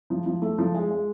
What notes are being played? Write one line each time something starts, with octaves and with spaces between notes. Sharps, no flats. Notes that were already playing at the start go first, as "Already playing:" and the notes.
F3
F3
A3
F3
G#3
G#3